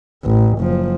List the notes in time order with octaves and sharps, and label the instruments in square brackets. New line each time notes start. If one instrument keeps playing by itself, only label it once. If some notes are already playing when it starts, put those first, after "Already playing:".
[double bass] A1
F#1 F3